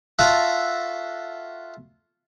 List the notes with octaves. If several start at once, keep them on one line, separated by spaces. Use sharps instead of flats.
F4 F#4 A4 E5 F#5